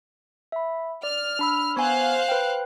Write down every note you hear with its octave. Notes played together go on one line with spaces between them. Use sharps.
E5 B5
D5 F6
D4 B5 E6
B3 C5 F5 G#5 F#6
B4 G5